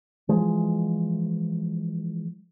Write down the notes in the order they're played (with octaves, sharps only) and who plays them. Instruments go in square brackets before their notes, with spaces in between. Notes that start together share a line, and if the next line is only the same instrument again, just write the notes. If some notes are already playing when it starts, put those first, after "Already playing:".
[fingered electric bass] E3 F3 G#3